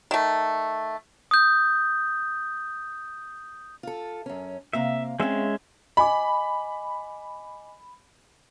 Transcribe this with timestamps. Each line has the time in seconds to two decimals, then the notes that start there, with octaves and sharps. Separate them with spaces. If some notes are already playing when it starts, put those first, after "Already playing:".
0.11 D#3 A3
1.31 D#6 G6
3.83 F4 A4
4.26 F#2 C#4
4.73 C3 A#3 E5 F5
5.20 G#3 C4 C#4 E5 F5
5.97 D#5 G#5 B5 D6